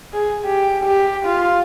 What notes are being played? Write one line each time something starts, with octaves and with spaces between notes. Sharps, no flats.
G#4
G4
G4
F4